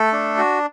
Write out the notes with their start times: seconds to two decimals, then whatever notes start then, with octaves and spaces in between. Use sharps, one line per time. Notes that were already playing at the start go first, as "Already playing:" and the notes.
Already playing: A3 A4
0.13 D4
0.38 F#4